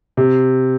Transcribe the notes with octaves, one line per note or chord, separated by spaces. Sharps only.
C3